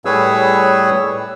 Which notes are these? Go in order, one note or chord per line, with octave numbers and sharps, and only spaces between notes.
A2 G3 G#4 B4 C#5 E6